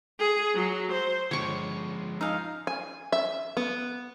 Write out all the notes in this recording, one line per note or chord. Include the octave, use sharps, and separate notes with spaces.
G#4
F#3
C5
G1 F3 G#3 C#5 C#6 C#7 D7
D#4 F5 G#5 D#6 E6
G#5
E5
B3